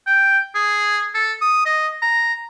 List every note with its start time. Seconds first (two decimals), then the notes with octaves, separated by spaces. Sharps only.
0.07 G5
0.55 G#4
1.14 A4
1.42 D#6
1.66 D#5
2.02 A#5